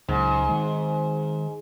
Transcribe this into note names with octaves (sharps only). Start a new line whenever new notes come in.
C#2 G#2 C#3 F#3
D#3 G#3